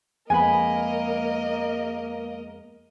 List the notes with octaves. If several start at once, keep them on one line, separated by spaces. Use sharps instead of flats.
F2 G#3 A#3 B3 A#4 D#5 G#5 B5